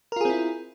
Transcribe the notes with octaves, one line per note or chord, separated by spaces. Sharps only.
C4 E4 F4 G#4 A#4